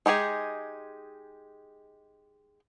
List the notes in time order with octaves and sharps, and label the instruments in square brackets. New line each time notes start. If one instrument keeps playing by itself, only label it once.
[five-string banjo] G#3 D#4 G4 G#4